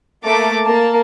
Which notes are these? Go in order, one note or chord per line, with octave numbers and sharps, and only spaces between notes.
A3 A#3 A#4 D6 A6
A#3 A#4 A5